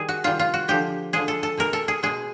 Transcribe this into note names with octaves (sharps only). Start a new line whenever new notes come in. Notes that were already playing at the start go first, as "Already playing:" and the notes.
Already playing: D#3 G3 G#4
F#4
C3 D#3 G3 F4
F4
F#4
D3 F3 G#3 G4
D3 F3 G#3 G#4
A4
A4
B2 G#3 A#4
A4
G#4
B2 G#3 G#4